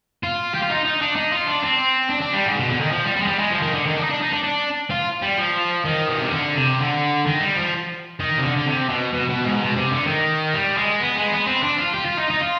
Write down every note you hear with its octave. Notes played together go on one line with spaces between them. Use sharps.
F4
G4
F4
D#4
D#4
D4
D#4
F4
D4
C4
D4
D4
G3
G#2
B2
D3
D#3
F3
G3
G3
G#3
G3
G#3
F3
D#3
D3
D#3
D4
D#4
D4
D#4
D4
D4
F4
G3
F3
D#3
B2
C3
D3
C3
D3
D#3
G3
F3
D#3
C3
D3
D3
C3
B2
B2
B2
G#2
B2
C3
D3
D#3
G3
G#3
B3
G#3
B3
C4
D4
F4
G4
F4
D#4
D#4
F4